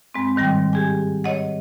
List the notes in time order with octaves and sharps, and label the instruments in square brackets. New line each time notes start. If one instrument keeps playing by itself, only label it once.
[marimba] G2 G#3 C4
G#2 D#3 G3 G5
G4 G#4 G#5
C#5 D#5 F#5